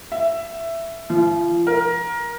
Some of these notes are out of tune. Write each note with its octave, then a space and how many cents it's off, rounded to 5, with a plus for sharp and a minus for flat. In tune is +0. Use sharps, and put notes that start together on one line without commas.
E5 +15
F3 -30
A#4 +20